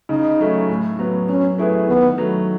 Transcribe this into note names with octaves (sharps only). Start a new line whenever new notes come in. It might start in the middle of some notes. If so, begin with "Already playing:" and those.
C#3 D#4
F#3 A3 C#4
A2
F#3 B3
F#3 C#4
A3 E4 G#4 B4
D#3 B3
F#3 A3